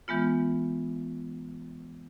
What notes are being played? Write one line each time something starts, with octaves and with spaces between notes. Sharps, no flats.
E3 G#3 B3 F4